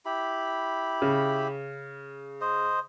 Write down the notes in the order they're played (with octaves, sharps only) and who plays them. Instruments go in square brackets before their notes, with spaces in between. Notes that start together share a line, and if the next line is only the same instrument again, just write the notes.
[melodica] E4 G4 B5
[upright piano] C#3
[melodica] C5 D#5